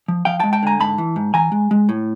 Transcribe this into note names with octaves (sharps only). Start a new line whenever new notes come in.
F3
F3 F5 G5
G#3 G5 A5
G5 A5
D3 G#5 A#5
G#2 A5 B5
E3
G#2
E3 G#5 A#5
G#3
G#3
A2